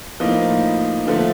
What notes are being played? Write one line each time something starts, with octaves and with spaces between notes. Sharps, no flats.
A2 F3 A#3 D#4
D3 F3 A3